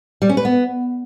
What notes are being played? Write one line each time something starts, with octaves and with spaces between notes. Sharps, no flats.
G3
C#4
B4
B3